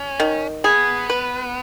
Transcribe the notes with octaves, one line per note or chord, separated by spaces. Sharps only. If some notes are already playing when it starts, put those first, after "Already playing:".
Already playing: C#4
D#3
B3 G#4
B4